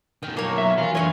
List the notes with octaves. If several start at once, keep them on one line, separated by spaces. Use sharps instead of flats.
B2 D#3 G5
F#3 A#3 C#5
E5
E3 F#3 F4
F#2 D3 F4 C#5 D#5 F5